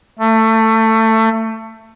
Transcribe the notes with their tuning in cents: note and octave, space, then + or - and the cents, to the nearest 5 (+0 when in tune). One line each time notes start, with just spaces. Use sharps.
A3 +20